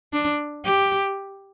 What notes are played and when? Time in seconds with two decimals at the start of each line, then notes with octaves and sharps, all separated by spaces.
0.13 D4
0.65 G4